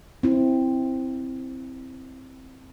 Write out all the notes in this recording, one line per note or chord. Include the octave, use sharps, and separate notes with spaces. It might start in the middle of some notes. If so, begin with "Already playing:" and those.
C4 E4